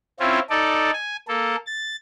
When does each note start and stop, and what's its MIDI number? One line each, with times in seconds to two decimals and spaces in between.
0.20 0.39 60
0.20 0.39 61
0.20 0.39 64
0.20 0.39 65
0.50 0.91 63
0.50 0.91 69
0.50 0.91 74
0.93 1.16 80
1.28 1.56 58
1.28 1.56 69
1.66 1.96 93